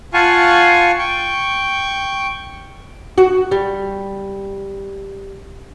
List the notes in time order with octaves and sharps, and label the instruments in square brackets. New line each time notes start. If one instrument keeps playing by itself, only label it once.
[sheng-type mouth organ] F4 F5 F#5 G#5 A5 C#6
G5 C#6
[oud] F#4
G3